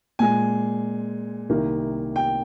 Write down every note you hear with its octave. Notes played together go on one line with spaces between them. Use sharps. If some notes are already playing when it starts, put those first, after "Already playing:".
A#2 G#3 G#5
C2 C3 D#3 A#3
G5